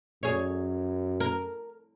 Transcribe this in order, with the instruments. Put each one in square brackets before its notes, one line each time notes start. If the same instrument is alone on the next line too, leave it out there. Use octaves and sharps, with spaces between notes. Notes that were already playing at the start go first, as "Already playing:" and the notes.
[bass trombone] F#2 [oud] G#4 C#5
[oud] A#4